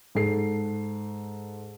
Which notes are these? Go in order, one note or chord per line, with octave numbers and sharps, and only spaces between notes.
G#2 A4 C7